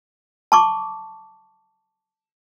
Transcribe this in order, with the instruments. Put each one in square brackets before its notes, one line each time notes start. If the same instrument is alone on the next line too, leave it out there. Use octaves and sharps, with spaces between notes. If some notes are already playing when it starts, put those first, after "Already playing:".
[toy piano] A5 C#6 D6